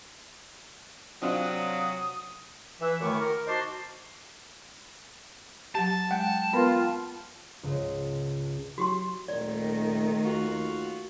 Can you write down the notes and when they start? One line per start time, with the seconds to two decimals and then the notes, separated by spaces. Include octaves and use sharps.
1.22 C3 F#3 C4 D4 F4 D#6
2.81 E3 E5
3.01 F#2 D#3 A3 E4 C#6 D6
3.21 A#4
3.47 D#4 F#4 C5 A5 C6 D6
5.75 F#3 G4 A5
6.11 G#3 F#5 G5
6.53 B3 F4 A#4 B4
7.63 C#2 G#2
8.78 F#3 F#4 G4 C6
9.28 D#1 D#3 A3 D5
10.24 D#2 F4 F#4